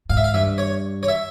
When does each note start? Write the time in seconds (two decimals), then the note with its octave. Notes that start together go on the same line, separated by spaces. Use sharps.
0.09 G#2 F5
0.17 E5
0.24 F5
0.34 G2 E5
0.58 C#5
1.03 C#5
1.08 E5